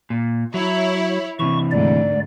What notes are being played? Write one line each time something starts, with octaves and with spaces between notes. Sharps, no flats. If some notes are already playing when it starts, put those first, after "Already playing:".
A#2
F#3 E4 C#5
C3 E3 C#6
D2 G#2 D5